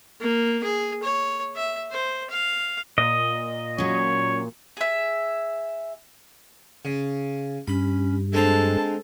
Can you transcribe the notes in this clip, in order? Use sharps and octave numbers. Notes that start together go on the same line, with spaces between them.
A#3
G#4
C#5
E5
C5
F5
A#2 D#5
F#3 C#4 C#5
G#4 E5
C#3
G2 C#4 B5
G#3 C4 D4 A4 A5 A#5